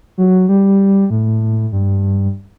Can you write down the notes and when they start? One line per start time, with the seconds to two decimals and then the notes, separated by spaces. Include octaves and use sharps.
0.18 F#3
0.49 G3
1.10 A2
1.72 G2